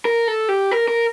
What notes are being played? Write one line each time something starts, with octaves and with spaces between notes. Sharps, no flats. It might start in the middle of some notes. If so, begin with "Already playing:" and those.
A#4
A4
G4
A#4
A#4